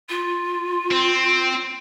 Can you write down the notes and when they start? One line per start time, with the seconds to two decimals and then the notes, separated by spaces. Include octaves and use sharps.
0.09 F4
0.91 C4